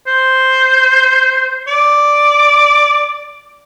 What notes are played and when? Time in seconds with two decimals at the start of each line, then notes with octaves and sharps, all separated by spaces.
0.07 C5
1.68 D5